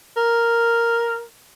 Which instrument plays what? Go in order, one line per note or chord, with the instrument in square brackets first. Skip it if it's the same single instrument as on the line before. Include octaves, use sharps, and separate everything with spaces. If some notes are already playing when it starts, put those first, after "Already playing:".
[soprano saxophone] A#4